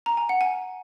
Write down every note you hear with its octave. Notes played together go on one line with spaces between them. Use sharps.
A#5
G#5
F#5
G#5